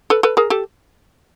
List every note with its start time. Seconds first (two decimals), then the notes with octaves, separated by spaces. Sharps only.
0.10 A4 B4
0.23 A4 B4
0.37 G#4 A#4
0.50 G4 A4